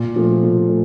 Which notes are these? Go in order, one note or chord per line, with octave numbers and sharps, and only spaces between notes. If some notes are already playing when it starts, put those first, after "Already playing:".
Already playing: A#2
F3 A3
A#2
A3